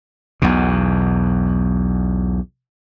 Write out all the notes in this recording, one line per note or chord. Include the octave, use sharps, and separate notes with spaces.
B1 E2 B2